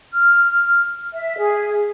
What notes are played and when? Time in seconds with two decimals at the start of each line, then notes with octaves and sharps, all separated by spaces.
0.12 F6
1.14 E5
1.38 G#4